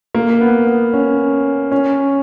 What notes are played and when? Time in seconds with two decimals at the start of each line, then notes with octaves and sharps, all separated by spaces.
0.15 A#3
0.41 B3
0.67 B3
0.93 C#4
1.72 C#4